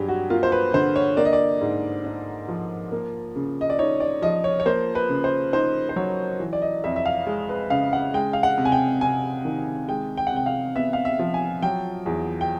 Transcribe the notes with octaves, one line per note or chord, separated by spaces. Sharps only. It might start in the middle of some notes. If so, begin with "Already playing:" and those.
Already playing: G2 F#3 G4 G#4
F#4
A#3 F4
C5
B4
D3 C5
C#5
A#3 D5
D#5
D5
G#2
D4
F3
A#3
C#3
D#5
D5
D#4 C#5
D5
F3 D#5
C#5
C#5
A#3 C5
B4
C#3
C5
D#4 C5
C5
F#3 C#5
E3
D5
D#5
F2 E5
E5
F5
G#3
B4
C#3 F5
F#5
G#3 G5
F5
F#5
C3
G#5
G5
C3 G#5
D#3
G#3 G5
G5
F#5
C3 G5
F5
B3 E5
F5
E5
F3
G#5
F#3 G5
E2
G5